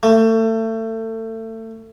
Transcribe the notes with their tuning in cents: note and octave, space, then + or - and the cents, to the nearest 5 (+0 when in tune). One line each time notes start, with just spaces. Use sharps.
A3 +30